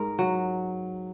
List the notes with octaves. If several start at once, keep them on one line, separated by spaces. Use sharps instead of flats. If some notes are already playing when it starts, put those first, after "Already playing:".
Already playing: G#2 A#4
F#3